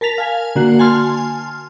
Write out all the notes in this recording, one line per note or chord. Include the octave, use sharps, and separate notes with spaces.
A#4 A5 B6 F7
F5 G#5
D3 A#3 F#4 F#5 C7
G#5 A5 C6 F6